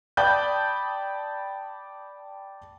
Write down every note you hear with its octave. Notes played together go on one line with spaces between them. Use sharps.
D5 G5 A5 B5 D#6 G6